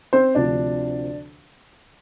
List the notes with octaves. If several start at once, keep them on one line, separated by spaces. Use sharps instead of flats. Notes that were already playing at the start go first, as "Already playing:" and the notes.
C4 C5
D2 C3 F3 D4 D5